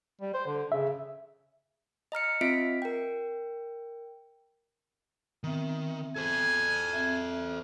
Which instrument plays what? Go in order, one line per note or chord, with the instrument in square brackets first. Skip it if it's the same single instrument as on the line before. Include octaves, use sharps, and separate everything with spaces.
[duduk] G3
C5
D3
[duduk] C#3 [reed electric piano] E5
[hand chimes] D#5 A#5 F6 C#7
C4 F4 D#5 E5 B6 D7
A#4 G5
[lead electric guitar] D#3 [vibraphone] B3 C4 E5
[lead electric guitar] A4 C5 [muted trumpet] G#5
[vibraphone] C4 E5